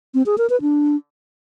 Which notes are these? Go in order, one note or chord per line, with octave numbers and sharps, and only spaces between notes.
C4
G#4
A#4
B4
D4